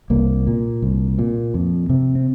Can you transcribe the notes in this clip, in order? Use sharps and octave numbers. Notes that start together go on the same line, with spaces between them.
C2 A#3
A#2
C2
A#2
F2
C3
C4